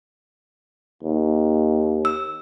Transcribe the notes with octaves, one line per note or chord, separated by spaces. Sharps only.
D#2
E6